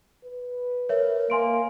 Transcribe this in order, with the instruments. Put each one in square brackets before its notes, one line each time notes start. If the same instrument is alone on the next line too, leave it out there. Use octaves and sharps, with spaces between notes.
[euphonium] B4
[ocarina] A#4 [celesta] C#5 E5
[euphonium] A#3 [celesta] G#5 C6 D7